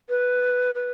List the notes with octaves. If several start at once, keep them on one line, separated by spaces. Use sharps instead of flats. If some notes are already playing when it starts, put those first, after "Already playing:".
B4
B4